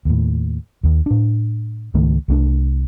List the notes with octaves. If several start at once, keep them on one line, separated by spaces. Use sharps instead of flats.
D#2 A2
D#2 D#3
A2 D4
C#2 G#2 D#3 A3
C2 A3 C#4 D4